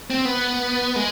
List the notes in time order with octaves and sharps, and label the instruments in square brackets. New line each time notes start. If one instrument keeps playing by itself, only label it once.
[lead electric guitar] C4
B3
G#3